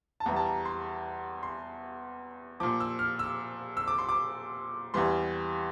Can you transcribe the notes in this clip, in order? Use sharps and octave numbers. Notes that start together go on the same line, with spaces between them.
A5
E2 E3 G3 A#5
A5
A#5
C6
C6
A#2 F3 D6
E6
F6
E6
E6
D6
C6
D6
E2 E3 G3 C6